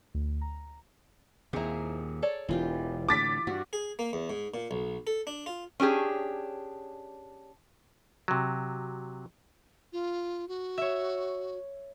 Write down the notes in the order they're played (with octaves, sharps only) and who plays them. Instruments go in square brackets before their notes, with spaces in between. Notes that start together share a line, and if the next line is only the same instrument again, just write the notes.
[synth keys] D2
A#5
[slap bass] D#2 A#2 [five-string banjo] C4 E4 [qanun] G#4 A#5
[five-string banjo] A4 C#5 D5
[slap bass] E1 [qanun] E3 F4 G4
[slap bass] A2 D3 [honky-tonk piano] D6 A6 B6
[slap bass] G2 [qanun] F#4
[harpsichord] G#4
A#3
E2
G#2
A#2
B1
A4
D4
F4
[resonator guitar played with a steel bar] C#4 D4 G4 G#4
[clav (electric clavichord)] C3 F#3
[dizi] F4
F#4
[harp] C#5 E5